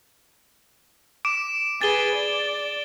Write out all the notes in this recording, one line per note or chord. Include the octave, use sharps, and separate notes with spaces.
D6 D7 E7
G#4 B4 A6 G7
D5